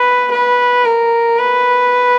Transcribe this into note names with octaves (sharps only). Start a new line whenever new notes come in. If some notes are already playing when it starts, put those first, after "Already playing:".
Already playing: B4
B4
A#4
B4